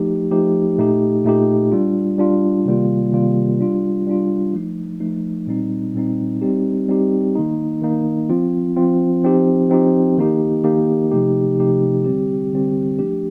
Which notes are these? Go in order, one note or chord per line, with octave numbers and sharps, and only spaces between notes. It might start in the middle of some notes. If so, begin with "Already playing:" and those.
Already playing: F3 A3 D#4 G4
F3 A3 D#4 G4
A#2 A3 D#4 G4
A#2 A3 D#4 G4
G3 D4 F4
G3 D4 F4
C3 D#3 G3 A#3 F4
C3 D#3 G3 A#3 F4
G3 D4 F4
G3 D4 F4
F3 A3 D#4
F3 A3 D#4
A#2 G3 C4 D#4
A#2 G3 C4 D#4
G3 C4 D#4 G4
G3 C4 D#4 G4
D#3 A#3 D#4
D#3 A#3 D#4
F3 C4 F4
F3 C4 F4
F3 C4 D#4 G4
F3 C4 D#4 G4
D#3 A#3 D#4 G4
D#3 A#3 D#4 G4
C3 F3 A3 D#4 G4
C3 F3 A3 D#4 G4
D3 G3 C4 G4
D3 G3 C4 G4
F3 A3 D4 G4